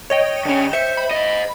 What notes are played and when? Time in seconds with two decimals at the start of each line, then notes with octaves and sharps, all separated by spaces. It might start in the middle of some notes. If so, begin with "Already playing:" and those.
0.10 C#5 D#5 G5
0.45 D3 C#4
0.73 C5 E5 C#7
0.97 B5
1.11 C5 D#5